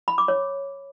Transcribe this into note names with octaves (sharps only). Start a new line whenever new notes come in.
B5
D6
C#5